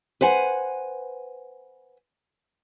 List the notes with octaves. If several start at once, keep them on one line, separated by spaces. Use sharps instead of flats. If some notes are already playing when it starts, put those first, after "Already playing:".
B4 C5 F#5 G#5